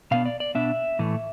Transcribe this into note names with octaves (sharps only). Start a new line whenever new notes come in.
B2 B3 D4 F5
D5
D5
B2 B3 D4 E5
A2 E3 A3